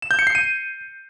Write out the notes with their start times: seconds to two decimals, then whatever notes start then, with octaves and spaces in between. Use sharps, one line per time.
0.02 E7
0.11 G6
0.19 C#7
0.27 C7
0.35 D#7